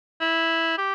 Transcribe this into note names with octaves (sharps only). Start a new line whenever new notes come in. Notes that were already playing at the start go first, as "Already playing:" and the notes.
E4
G4